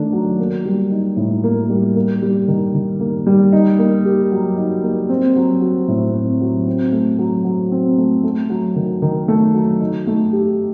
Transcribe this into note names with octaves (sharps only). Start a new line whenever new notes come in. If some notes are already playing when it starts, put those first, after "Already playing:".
Already playing: D#3 A3 D4
F#3
A#3
G3
D#4
A2
A#3
G3
A#3
G3
D#3
D#3
A#3
G3
D#4
A#3
G4
F#3
D#4
A#3
C4
F#3
F#4
A2
C4
F#3
C4
A3
F#3
F#3
C4
A3
A3
F#3
D#3
D#3
A3
F#3
D#4
A3
G4